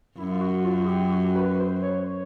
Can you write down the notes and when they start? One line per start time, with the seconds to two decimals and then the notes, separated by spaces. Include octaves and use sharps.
0.18 F#2 E4
0.32 F4
0.41 F#4
0.65 F4
0.85 G#4
0.88 G4
1.12 F#4
1.36 B4
1.60 C5
1.83 C#5